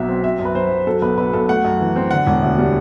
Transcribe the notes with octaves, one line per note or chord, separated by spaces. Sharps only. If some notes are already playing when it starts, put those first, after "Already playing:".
Already playing: B1 B2 F#3 E5
C4
C4 E5
F#2
B4
F#3 C5
F#2
F#3 A4
B1 B4
B2 B4
B1 A4
A3 F#5
F#2
E3
C4
D3 F#5
E1
D2
G3